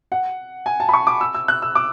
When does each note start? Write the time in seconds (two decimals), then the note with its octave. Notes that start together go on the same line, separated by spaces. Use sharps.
0.12 F#5
0.66 G#5
0.80 A5
0.89 B5
0.94 C#6
1.07 D6
1.21 E6
1.34 E6
1.48 F#6
1.62 E6
1.75 D6